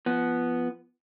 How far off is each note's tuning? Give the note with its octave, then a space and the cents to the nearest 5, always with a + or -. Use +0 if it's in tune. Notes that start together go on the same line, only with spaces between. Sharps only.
F3 -20 B3 +0